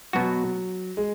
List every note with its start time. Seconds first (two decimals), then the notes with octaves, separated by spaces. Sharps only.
0.13 B2 F#3 B3 F#4
0.97 G#3